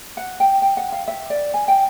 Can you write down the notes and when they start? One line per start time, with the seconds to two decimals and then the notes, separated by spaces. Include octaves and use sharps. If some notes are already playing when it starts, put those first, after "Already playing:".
0.17 F#5
0.40 G5
0.62 G5
0.77 F#5
0.92 F5
1.08 E5
1.30 D5
1.54 G#5
1.68 G5